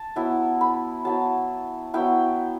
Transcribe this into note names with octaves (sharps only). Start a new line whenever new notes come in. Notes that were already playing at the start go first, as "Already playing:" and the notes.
Already playing: A5
F#3 B3 E4
B5
F#3 B3 E4 A5
F#3 B3 E4 G5